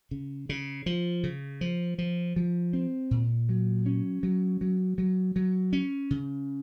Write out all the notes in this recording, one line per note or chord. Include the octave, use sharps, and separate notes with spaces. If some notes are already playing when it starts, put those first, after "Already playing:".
C#3
C#3
F3
C#3
F3
F3
F3
C4
A#2
F#3
C#4
F#3
F#3
F#3
F#3
C#4
C#3